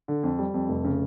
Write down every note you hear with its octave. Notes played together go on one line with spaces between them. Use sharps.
D3
F2
G3
F2
F1
C#3